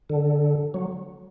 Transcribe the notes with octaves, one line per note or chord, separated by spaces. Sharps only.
D3
F#3